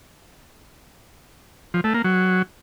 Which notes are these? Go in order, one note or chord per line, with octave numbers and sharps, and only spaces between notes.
F3
A3
A#3
F#3